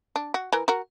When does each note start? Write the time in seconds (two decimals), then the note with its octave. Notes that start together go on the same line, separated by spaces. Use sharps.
0.16 D4
0.34 F#4
0.53 E3 A#4
0.68 F#4 A#4